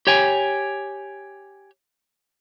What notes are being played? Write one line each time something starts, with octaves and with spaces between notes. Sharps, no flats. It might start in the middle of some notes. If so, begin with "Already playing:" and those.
G4 C#5 G5 G#5